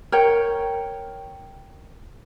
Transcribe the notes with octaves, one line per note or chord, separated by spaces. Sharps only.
A#4 C#5 G5